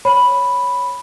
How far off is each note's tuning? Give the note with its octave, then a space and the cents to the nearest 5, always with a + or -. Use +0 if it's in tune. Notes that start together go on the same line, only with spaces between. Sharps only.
C#5 +0 B5 +0